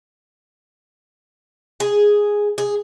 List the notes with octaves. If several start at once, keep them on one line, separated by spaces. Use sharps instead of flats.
G#4
G#4